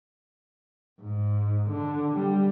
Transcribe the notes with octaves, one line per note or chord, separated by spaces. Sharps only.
G#2
D3
G3